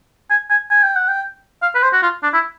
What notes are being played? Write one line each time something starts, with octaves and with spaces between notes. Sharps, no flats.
G#5
G#5
G#5
G5
F#5
G5
F5
B4
C5
F#4
F4
D4
E4